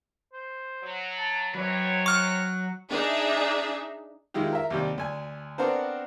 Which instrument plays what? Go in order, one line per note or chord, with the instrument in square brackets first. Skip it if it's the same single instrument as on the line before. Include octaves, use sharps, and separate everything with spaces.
[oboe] C5
[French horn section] F#3
[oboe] A5
[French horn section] F#2 C4 C#5 [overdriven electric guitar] F#3 [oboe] B4
[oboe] F#5 [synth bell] C#6 F6
[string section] D4 D#4 G#4 E5
[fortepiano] D#3 G#3 E4 F4 G4
A#4 E5
D#2 C3 G3
D2 G#5
B3 C4 D4 F#4 A#4 C5